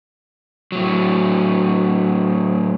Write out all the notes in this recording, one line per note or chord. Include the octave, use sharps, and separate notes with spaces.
A2 F#3